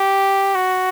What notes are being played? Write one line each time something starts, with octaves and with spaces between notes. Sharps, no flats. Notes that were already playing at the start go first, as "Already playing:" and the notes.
Already playing: G4
F#4